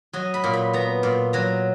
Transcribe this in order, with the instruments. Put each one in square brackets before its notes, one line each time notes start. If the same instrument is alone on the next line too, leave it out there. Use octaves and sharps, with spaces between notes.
[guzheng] F#3 D#5
B5
A#2
B5
B3 A#5
A#2
F#3 A#5